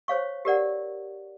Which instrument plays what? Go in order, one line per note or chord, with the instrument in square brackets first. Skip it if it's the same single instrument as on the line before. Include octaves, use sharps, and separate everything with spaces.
[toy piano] C5 C#5 F5 C#6
G4 A#4 D5 F#5